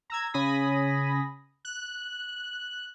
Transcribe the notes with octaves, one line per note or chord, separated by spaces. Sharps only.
A#5 E6 G#6
C#3 C#4 G#5 B5 D#6 A#6
F#6